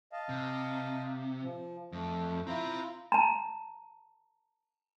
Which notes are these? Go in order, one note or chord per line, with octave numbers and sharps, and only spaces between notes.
D#5 F5 A5
C3
F3
F2 A3
C4 E4 F4 E5 A#5
A5 A#5